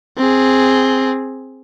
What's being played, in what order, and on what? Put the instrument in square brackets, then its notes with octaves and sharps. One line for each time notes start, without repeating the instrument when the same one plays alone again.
[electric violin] C4 G#4